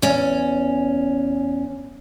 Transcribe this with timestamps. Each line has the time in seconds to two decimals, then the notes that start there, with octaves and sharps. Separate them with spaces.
0.02 E2 C#4